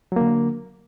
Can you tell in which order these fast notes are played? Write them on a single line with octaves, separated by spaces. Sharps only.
F#3 A#3 D3